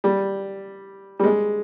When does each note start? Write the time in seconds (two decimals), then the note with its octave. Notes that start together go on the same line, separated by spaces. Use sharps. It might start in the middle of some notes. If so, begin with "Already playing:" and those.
0.04 G3
1.20 G3
1.24 G#3